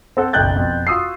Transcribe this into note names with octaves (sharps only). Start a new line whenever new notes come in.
C4 A4 F#5
F#1 B1 G5 F#6 G6 A6
F2 B2
F4 F#4 D#6 E6 C7